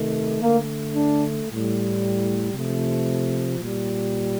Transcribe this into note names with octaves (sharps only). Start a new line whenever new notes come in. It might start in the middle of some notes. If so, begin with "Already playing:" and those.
Already playing: C3 D#3 A3
D3 A3 A#3
D4
A2 G3
C3 F3 A3
A#2 G3